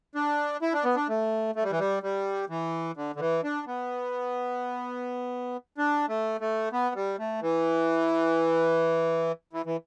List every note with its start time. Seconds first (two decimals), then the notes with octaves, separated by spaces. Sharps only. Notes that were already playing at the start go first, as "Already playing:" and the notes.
0.15 D4
0.62 E4
0.73 D4
0.84 B3
0.96 D4
1.09 A3
1.56 A3
1.63 G3
1.71 E3
1.79 G3
2.03 G3
2.49 E3
2.97 D3
3.16 D3
3.20 E3
3.44 D4
3.67 B3
5.78 D4
6.09 A3
6.41 A3
6.72 B3
6.95 G3
7.19 A3
7.42 E3
9.53 E3
9.66 E3